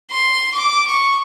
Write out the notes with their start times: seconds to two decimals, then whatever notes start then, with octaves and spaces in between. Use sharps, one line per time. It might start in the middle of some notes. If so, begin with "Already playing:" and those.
0.10 C6
0.54 D6
0.87 C#6